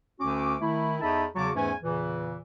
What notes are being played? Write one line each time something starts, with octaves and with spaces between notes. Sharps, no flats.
D2 D3 C#4 F#4 D6
D#3 A3 E4
E2 D#4 A4 E5 A5 B5
E2 C#3 F#3 F#4 A5 D6
E2 G#2 E3 A3 C#4 G#5
E2 A#2 C#3 E3